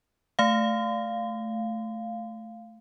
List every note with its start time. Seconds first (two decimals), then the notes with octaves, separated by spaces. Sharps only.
0.39 A3 F5